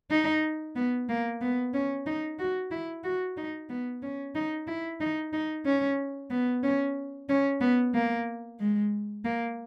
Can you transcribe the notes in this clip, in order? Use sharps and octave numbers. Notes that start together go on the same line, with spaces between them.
D#4
B3
A#3
B3
C#4
D#4
F#4
E4
F#4
D#4
B3
C#4
D#4
E4
D#4
D#4
C#4
B3
C#4
C#4
B3
A#3
G#3
A#3